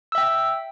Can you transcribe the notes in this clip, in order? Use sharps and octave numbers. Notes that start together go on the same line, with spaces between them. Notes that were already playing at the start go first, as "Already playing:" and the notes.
E5 G5 E6